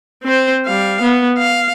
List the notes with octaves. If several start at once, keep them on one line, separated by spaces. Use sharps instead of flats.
C4 C5
G3 F5
B3
F5